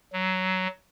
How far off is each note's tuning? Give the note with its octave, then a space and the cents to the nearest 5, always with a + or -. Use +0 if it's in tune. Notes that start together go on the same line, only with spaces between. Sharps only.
F#3 +15